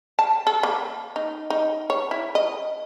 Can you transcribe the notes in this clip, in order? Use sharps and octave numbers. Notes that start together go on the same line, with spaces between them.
A5
A4
A#3
D#4
D#4
C#5
E4
D#5